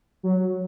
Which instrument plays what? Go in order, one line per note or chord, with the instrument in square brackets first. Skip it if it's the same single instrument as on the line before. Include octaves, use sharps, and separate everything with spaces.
[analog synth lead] F#3